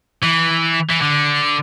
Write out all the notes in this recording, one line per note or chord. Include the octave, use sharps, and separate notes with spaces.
E3
E3
D3